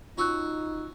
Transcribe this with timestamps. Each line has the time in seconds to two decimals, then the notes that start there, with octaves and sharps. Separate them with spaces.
0.18 C#4 D#4 F4 F#4 E6 F#6